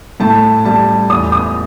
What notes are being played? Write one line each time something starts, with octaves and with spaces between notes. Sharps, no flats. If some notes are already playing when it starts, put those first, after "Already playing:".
A2 A5
G3 A5
E2 D#6
D#6